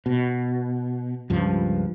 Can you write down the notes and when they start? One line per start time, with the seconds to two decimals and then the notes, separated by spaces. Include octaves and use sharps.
0.06 B2
1.30 C#2 G2 F3